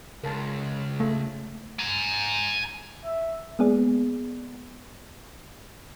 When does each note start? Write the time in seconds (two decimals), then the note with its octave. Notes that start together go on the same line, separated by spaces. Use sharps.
0.24 C#2 A#4 A5
1.00 A3
1.79 G#5 A#5
3.04 E5
3.59 G#3 A#3 B3 G#4 D5